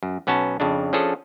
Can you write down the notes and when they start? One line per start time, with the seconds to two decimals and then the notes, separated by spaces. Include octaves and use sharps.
0.03 F#2
0.27 B1 B3 C#4 F#4 A5
0.60 F2 C#3 D4
0.93 F3 C#4 D4 G#4 A4